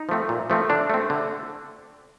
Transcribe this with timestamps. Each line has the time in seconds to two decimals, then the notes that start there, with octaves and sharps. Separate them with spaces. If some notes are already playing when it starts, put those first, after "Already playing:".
Already playing: D#4
0.09 F3 A3 C4
0.29 A#2
0.50 F3 A3 C4
0.70 D3 D4
0.90 A3 C4
1.10 D3